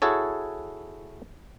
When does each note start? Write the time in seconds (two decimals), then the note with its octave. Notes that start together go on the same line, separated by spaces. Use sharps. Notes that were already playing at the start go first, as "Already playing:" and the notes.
0.02 E4 F#4 G#4 A4 C#5